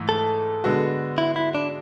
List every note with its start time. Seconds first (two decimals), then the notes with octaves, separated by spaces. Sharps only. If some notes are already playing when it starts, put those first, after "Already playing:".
Already playing: G#2 E3 A3
0.09 A4
0.64 D3 G#3 B3 F#4
1.18 E4
1.36 E4
1.55 D4